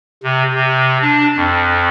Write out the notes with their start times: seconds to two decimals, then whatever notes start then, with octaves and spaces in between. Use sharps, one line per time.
0.23 C3
0.54 C3
1.01 D4
1.36 F2